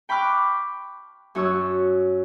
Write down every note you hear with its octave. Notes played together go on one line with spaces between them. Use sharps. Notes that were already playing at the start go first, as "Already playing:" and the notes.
G5 B5 C#6 D6 F6 F#6
F#2 F#4 C#5 C#6 E6